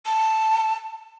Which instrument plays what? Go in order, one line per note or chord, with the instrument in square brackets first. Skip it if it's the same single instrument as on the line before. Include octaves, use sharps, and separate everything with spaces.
[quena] A5